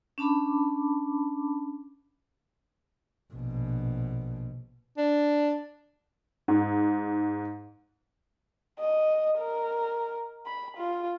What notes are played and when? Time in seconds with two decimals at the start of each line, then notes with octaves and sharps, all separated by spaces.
0.18 C#4 D4 A5 B5 D6
3.34 A#1 B2
4.98 D4
6.48 G#2
8.80 D#5
9.39 A#4
10.47 B5
10.77 F4